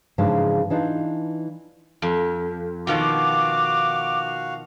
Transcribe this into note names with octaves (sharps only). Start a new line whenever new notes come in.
G#2 C#3 E3 F3 G#3 D4
E3 D4 D#4 F4
F2
B2 D#3 F3 F#4 F5 D6